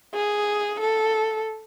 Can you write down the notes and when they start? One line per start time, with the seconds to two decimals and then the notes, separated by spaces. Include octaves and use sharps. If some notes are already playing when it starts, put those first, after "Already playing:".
0.14 G#4
0.80 A4